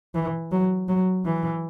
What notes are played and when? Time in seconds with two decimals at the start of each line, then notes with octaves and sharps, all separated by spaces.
0.15 E3
0.51 F#3
0.88 F#3
1.25 E3